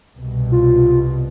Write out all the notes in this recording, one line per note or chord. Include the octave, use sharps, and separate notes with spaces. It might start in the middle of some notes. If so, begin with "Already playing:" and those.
C2 B2
F4